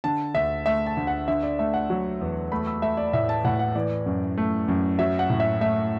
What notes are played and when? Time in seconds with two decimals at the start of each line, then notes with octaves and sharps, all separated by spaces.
0.04 D3 A5
0.35 D2 E5
0.66 A3 E5
0.86 A5
0.97 D2
1.07 F#5
1.28 D3 E5
1.43 D5
1.59 A3 E5
1.74 F#5
1.90 F#3
2.21 E2
2.52 A3 B5
2.67 E6
2.82 A3 E5
2.97 D5
3.13 A2 E5
3.29 A5
3.45 A2 F#5
3.59 F#5
3.75 E3 D5
4.06 F#2
4.38 A3
4.68 F#2
4.99 F#3 E5
5.19 F#5
5.30 A2
5.40 E5
5.61 A3 E5